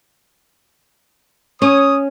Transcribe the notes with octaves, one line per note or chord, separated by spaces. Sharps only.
C#4 C#5 D#6